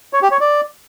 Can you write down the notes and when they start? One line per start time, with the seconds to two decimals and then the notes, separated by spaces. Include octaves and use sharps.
0.13 C#5
0.22 G4
0.31 C#5
0.40 D5